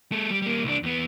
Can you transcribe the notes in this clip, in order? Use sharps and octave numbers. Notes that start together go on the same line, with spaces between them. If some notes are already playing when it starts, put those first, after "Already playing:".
G#3 A4
G3
G3 A#3
C2 D4
E2 B3